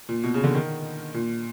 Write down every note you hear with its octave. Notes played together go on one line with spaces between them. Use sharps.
A#2
B2
C#3
D3
D#3
A#2